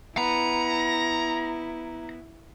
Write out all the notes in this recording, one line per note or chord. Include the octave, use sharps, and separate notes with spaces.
B3 E4 A#5